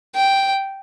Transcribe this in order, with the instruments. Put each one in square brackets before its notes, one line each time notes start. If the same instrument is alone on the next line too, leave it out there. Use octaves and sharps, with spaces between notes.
[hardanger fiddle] G5